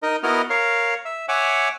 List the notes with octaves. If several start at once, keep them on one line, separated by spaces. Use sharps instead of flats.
D#4 A#4 D#5
B3 E4 F#4 A#4 D#5 F6
A#4 C#5 F5
E5
C#5 E5 F#5 G#5 D6